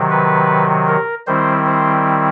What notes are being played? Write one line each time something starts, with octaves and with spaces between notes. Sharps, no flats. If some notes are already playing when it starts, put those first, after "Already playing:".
Already playing: C3 D#3 F#3
B4
A#4
D#3 G3 C4 E4 C5
C5